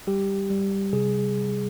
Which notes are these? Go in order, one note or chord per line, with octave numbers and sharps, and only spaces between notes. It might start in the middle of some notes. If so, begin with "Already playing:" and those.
G3 G4
G3
C3 G#4